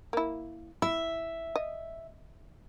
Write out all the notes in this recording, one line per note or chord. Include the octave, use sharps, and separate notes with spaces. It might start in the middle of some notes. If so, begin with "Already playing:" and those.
A#3 E4
E4 E5
D#5